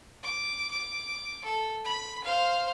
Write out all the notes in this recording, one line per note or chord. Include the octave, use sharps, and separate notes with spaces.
D6
D6
A4
B5
C5 F5